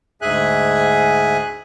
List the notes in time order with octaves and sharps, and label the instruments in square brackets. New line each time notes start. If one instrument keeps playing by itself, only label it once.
[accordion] D2 G#2 G#4 E5 G#5 F#6